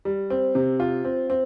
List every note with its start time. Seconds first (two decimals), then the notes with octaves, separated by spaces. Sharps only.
0.05 G3
0.30 C4
0.55 C3
0.80 F4
1.05 C4
1.30 C4